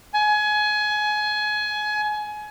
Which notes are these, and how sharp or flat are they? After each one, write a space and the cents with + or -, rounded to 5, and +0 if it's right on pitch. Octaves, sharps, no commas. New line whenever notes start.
G#5 +25